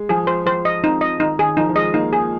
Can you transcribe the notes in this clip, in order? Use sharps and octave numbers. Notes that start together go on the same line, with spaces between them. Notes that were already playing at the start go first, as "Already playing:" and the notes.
Already playing: G#3
F3 G#4
C5
F3 C5
D#5
C4 D#4
D#5
D#3 D#4
D#3 G#4
F3 D#4
F3
G#3 D#5
A#3 D#4
G#4